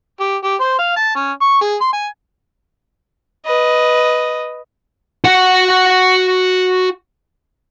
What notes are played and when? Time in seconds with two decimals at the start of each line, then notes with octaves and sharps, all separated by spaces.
0.20 G4
0.43 G4
0.60 C5
0.79 F5
0.96 A5
1.15 C#4
1.41 C#6
1.61 G#4
1.81 C6
1.93 G#5
3.46 B4 D#5
5.24 F#4 F#5